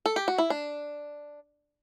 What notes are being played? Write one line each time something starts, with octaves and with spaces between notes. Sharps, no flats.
A4
G4
F#4
E4
D4